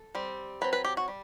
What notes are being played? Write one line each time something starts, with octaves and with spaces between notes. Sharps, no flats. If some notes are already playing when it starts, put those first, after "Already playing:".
Already playing: A4
G3 C4
F#3 C4 B4
B4
G4
F#4
G3